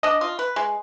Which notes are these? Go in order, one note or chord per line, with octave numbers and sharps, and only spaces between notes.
D4 D#5
F4
B4
G#3